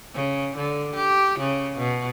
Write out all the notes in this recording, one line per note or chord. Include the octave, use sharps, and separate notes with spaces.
C#3
D3
G4
C#3
B2